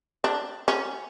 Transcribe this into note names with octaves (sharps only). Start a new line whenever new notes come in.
D4
C#4